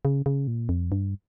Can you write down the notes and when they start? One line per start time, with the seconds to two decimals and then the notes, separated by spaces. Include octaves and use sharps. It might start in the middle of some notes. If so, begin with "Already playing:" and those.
0.05 C#3
0.26 C#3
0.47 A#2
0.69 F2
0.92 G2